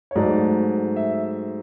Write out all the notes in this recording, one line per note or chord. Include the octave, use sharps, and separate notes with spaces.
C#5
G#2 F#3 A3 D5
E5